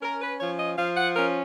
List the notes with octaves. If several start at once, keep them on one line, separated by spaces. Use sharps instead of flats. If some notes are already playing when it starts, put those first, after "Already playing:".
C#4 A#4
B4
F3 C#5
D#5
F3 F5
F#5
C#4 A#4